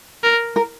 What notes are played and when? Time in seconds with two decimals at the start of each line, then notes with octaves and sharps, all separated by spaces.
0.23 A#4
0.56 A#4